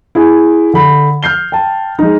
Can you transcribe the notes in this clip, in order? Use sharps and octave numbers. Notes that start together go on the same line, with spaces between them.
E4 G#4 G#5
D3 B5
F6 G6 C7 G7
G5 A5
G#3 D#4